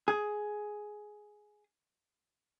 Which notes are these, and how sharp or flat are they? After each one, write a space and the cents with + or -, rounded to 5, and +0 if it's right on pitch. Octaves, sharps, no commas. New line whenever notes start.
G#4 +10